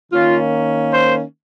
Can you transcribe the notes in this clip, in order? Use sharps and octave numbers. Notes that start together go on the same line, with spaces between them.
D#3 A#3 C#4 F4
C5